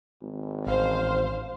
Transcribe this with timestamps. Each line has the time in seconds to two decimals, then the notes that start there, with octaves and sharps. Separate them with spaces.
0.22 G#1
0.66 A1 C5 F5